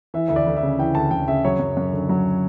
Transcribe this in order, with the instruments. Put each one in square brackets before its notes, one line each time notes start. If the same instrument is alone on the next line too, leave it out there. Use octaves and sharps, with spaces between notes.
[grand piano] E3 E5
D2 E5
D5
D2
E5
C#3
E3 G5
D2 A5
D2 G5
C#3 E5
F#3 C#5
F#2
F#2
D3
F#3